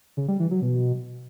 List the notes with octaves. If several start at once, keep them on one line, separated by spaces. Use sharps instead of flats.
C#3
G3
E3
F#3
B2